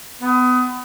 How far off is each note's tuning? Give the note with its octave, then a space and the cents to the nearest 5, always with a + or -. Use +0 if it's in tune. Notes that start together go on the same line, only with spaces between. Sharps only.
B3 +30